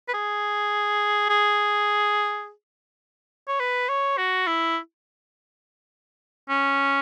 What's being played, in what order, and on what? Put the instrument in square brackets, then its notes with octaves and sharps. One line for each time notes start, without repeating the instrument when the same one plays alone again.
[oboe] B4
G#4
G#4
C#5
B4
C#5
F#4
E4
C#4